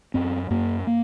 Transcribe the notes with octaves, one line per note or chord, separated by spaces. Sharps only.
F#2 C4
F#2 A#3
A#3